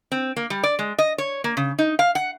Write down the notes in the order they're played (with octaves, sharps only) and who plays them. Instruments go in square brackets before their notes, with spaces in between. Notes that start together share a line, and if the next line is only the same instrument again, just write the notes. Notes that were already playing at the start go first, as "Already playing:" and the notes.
[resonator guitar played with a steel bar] C4
A#3
G3
D5
G#3
D#5
C#5
A#3
C#3
D#4
F5
F#5